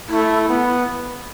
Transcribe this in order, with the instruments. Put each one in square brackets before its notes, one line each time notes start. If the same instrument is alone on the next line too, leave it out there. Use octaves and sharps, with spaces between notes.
[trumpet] A3 [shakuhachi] E4
[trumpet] B3